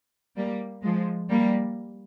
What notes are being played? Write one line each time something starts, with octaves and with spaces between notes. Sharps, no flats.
G3 A#3
F3 G#3
G3 A#3